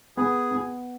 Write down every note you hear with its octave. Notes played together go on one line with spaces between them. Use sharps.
B3 G#4
B3